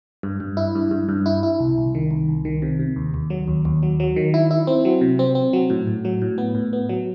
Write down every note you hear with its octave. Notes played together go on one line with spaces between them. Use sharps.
G2
G2
E4
G2
G2
G2
E4
E4
C2
C2
D#3
C2
C2
D#3
C3
C3
D#2
D#2
F#3
D#2
D#2
F#3
F#3
D#3
E4
E4
C4
F#3
C3
C4
C4
F#3
A2
A2
F#3
A2
B3
A2
B3
F#3